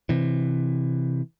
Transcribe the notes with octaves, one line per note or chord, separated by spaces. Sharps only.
C3 E3